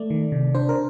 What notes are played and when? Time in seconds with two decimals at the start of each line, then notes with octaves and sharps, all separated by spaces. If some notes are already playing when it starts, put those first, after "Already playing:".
Already playing: A3 D5
0.10 D#3
0.32 C3
0.54 D4 C5
0.69 A#4